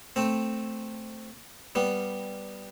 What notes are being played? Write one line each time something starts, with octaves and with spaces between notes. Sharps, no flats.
A3 C4
G3 B3